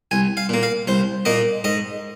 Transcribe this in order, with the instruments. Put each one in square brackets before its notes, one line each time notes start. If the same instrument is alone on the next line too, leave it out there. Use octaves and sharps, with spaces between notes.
[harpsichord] C2 G#5
F5
A#2 A#3
F5
C2 C5
A#2 A#3 D#5
G#2 D#5